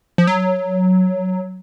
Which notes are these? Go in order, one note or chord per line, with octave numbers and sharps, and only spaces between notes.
F3
F#3